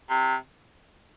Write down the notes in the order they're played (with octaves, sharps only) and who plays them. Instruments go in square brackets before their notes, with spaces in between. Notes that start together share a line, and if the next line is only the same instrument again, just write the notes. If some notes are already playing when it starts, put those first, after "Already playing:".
[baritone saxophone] C3